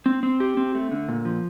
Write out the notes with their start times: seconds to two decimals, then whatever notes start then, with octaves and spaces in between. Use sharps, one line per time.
0.06 C4
0.23 C4
0.40 G4
0.57 C4
0.75 A3
0.91 D3
1.08 A#2
1.25 F3